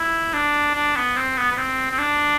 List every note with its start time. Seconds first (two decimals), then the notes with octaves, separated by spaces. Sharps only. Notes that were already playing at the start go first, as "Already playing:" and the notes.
Already playing: E4
0.34 D4
0.75 D4
0.96 B3
1.16 C4
1.37 B3
1.52 B3
1.57 C4
1.91 C4
1.99 D4